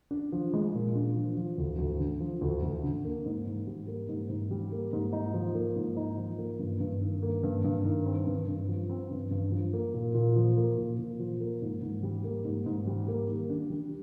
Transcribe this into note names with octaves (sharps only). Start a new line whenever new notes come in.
D4
F3
G#3
A#2
D4
F3
F3
D2
D2
D3
F3
D2
D2
D3
A#3
G#2
G#2
G3
A#3
G#2
G#2
G3
A#3
G#2
D#4
F3
A#3
G#2
D#4
F3
A#3
G2
G2
D#3
A#3
G2
G2
D#3
C4
G2
G2
F3
C4
G2
G2
F3
A#3
A#2
A#2
F3
A#3
A#2
A#2
F3
A#3
G#2
G#2
G3
A#3
G#2
G#2
G3
A#3
D#3
D4
G3